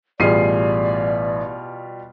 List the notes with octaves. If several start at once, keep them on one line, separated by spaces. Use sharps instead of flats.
A1 B2 G3 F4 G#4 D5 C7 D#7